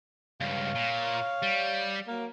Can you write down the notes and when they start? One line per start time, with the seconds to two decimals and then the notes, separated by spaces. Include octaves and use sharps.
0.40 C#2 G2 C#5 F5
0.75 A#2
1.42 G3
2.08 F#3 A#3